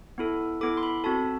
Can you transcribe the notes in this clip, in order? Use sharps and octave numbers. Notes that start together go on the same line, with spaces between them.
B3 E4 A4
B3 E4 A4 D6
C6
B5
C4 F#4 A4 A5